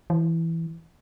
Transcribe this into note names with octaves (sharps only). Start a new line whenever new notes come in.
E3